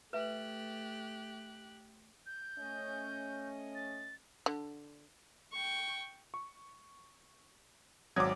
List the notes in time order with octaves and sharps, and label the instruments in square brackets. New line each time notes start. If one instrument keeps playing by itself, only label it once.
[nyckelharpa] A3 [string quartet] G4 F#6 [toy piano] B4 E5
[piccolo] G6
[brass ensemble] A3 C#4 D#5
[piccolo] A6
[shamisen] D3
[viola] G5 C#6
[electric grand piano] C#6
[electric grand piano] G#1 D#6 G#6 [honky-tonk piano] F#3 D6